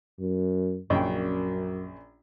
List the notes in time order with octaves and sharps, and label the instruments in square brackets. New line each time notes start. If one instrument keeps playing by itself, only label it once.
[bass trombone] F#2
[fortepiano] A#1 C#3 G5 [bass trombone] F#2